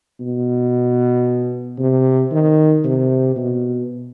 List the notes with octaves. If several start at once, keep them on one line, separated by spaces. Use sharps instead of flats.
B2
C3
D#3
C3
B2